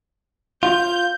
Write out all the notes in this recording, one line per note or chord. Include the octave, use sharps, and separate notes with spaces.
F4 G6